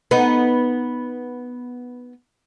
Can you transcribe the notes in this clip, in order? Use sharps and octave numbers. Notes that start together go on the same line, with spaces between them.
B3 D#4